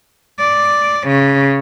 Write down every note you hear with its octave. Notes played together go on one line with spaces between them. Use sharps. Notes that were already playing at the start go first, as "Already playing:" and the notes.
D5
C#3